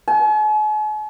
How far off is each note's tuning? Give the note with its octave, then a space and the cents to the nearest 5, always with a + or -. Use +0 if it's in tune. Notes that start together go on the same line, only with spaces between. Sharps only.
G#5 +45